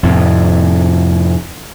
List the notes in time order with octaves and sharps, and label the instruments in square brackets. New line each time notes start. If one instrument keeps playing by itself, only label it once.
[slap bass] F2 A2 C3